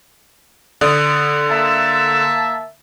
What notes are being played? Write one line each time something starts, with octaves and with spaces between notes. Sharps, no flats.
D3 D5 D#6
A#3 E5 A5